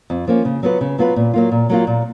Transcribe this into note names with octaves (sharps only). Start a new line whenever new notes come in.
F2
F3 A#3 C#4
C#3
F#3 B3 F4 B4
C#3
F#3 B3 F4 B4
A#2
F#3 A#3 F4
A#2
F#3 A#3 F4
A#2